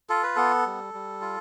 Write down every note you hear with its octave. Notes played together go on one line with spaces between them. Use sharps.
F4 A4
B4
B3 A4
G3
G3
F4